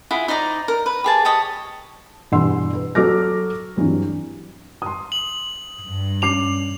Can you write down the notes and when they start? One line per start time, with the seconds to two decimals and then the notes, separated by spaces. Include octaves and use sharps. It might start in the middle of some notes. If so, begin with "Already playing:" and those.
0.11 E4 F4 G#4 F#5
0.28 D#4 C5 D5 A#5
0.68 A#4
0.86 B4
1.04 G4 G#4 A5
1.25 G4 C#5 D#5 A5
2.32 E2 G2 B2 F#5 C6 E6
2.73 B4
2.95 F#3 F#4 A4 D6 F6 A#6
3.76 G2 E3 F#3 C4
4.82 C6 D#6
5.12 F#7
5.88 G2
6.22 C#4 D6 C7 F7